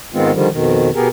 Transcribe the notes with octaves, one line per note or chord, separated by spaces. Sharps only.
G#2 D#3 G#3 B3 C4 F4
D3 D#3 F3 G3
F2 B2 D#3
B2 B3 G4 G#4 A#4